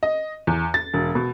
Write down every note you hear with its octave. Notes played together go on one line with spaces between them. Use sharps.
D#5
E2
A6
E1
B2